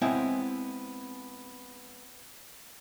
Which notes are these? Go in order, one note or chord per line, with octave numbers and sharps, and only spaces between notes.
G#3 B3 C4 E4 C#5 G5